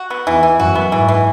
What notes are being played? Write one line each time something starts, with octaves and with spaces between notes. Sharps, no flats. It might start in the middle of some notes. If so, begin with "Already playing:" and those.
Already playing: F#4
B3
E2 E3
E3
F#2 F#4
B3
G#2 E3
E3